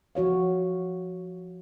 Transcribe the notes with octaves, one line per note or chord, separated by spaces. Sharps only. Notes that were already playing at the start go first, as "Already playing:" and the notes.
F3 F#4 C#5 F5